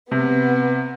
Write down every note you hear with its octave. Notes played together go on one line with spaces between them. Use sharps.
C3 B3